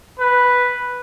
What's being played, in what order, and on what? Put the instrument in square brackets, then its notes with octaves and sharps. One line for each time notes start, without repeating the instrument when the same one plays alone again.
[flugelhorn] B4